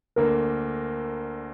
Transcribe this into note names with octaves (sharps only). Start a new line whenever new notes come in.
D2 D3 A#3 A#4